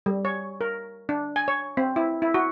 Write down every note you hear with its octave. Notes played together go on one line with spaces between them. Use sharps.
G3
C#5
A#4
D4
G#5
C#5
C4
E4
E4
F#4